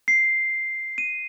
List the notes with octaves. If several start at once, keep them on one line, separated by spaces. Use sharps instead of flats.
C7
D#7